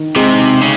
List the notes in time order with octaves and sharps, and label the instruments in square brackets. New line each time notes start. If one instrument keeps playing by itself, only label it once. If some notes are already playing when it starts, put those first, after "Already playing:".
Already playing: [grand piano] D#3
[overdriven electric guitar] C3 [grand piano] G#3 D#4 G#4
[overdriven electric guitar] C#3